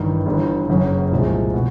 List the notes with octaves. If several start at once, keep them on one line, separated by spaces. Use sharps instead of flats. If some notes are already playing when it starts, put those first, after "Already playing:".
Already playing: A1 G2 D#3
G1 G2 E3
F#1 F#2 C#3
C2 A#2 F3 G#3
B2